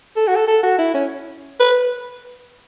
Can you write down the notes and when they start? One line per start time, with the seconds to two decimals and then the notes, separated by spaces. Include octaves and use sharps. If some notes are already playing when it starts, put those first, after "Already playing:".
0.17 A4
0.27 F#4
0.36 A4
0.48 A4
0.63 F#4
0.79 E4
0.94 C#4
1.60 B4